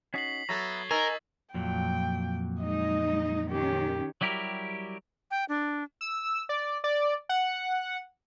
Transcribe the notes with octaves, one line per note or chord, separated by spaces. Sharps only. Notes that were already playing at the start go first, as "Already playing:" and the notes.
C#4 D#4 F#4 B6 C7 F#7
F#3 B3 A4 E5 A#5 C#6 G#6 A6
D#4 A#4 G#5 C#6 E6 A6
F2 A#2 F#3 G5
G#3 D#4 D#5
D#3 C#4 G4
F#3 G3 E4 G4 A#4
G5
D4
E6
D5
D5
F#5